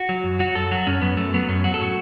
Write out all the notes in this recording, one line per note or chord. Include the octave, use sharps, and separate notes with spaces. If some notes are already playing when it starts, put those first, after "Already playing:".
Already playing: F#4
F#3
F#2
F#3 F#4
F#2 A4
F#3 F#4
F#2 C#4
F#2 B3
F#2 A3
F#3 B3
F#2 C#4
F#3 F#4
A4
A2 F#4